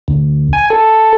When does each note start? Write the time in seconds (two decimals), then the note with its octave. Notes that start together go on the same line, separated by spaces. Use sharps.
0.08 D2
0.53 G#5
0.70 A4